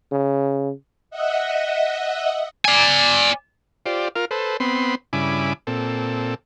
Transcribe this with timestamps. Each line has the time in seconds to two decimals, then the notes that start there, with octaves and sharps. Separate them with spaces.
0.12 C#3
1.11 D#5 E5 F#5
2.65 D5 G#5
3.86 F4 G4 C5 D5
4.16 F4 A#4 F6
4.31 A4 B4 C5
4.60 B3 C4 B5 C6
5.13 G2 C#3 E4 G#5 B5 D6
5.67 A#2 C4 A4